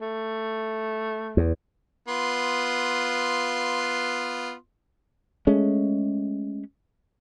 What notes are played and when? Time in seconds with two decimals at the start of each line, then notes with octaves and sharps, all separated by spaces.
0.01 A3
1.37 E2
2.08 B3 F4 C6
5.47 G#3 A3 C#4